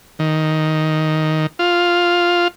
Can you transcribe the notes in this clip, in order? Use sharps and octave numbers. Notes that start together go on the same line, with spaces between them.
D#3
F4